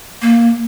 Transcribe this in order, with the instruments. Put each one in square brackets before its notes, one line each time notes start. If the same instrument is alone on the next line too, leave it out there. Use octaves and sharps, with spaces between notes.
[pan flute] A#3